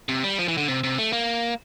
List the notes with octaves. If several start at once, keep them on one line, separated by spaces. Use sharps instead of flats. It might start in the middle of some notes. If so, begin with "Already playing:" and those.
C3
G3
F3
E3
D3
C3
C3
A3
A#3